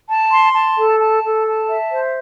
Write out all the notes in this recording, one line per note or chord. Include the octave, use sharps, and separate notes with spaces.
A5
C6
A5
A4
A5
A4
A5
E5
C5